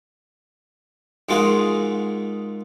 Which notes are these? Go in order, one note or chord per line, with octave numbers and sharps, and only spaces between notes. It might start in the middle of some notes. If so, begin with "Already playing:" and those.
G#2 G#3 A#3 F4 F#4 G#4